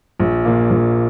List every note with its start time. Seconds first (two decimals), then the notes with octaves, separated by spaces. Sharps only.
0.20 A#1
0.45 A#2 A#3
0.70 A#1